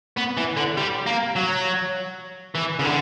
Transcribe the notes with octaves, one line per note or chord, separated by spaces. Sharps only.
B3
E3
D3
G3
A#3
F#3
E3
C#3
D3